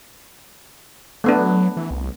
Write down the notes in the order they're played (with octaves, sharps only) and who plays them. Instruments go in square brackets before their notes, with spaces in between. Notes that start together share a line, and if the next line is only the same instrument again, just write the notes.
[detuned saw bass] F#3 [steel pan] A3 B3 D4
[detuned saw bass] E3
C2